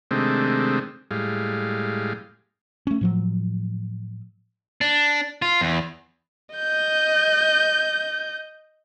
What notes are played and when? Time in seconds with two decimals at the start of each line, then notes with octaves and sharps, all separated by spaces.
0.11 C3 D#3 G#3 A3 C4 D4
1.11 A2 G3 G#3 F5
2.87 A3 C#4
3.01 A2 F3 F#3
4.81 D4
5.42 F4
5.61 E2
6.56 D#5 G6